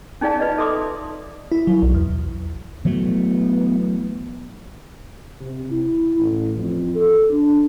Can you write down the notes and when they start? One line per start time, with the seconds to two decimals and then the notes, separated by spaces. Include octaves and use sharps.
0.21 C#4 D#4 G#4 D5 F5 A5
0.39 F4 B4 D5 D#5
0.58 A4 E5 C6 D6 D#6
1.52 E4
1.67 F#3
1.82 B1
1.94 E2
2.85 E3 F#3 A3 B3
5.40 C3
5.70 E4
6.18 A1
6.58 F2
6.95 A4
7.30 D4